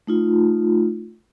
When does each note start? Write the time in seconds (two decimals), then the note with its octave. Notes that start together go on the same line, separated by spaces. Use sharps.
0.07 A3 D#4 F4